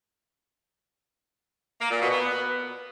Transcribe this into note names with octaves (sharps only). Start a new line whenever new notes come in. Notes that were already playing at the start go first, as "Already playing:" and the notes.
A#3
A#2
B2
B3